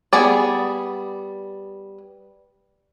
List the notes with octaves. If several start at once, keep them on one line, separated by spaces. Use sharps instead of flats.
G3 B3 G#4 D5